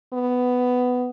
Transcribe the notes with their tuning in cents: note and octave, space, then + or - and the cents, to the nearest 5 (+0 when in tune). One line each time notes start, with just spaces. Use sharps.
B3 +10